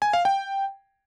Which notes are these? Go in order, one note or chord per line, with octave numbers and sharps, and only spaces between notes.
G#5
F5
G5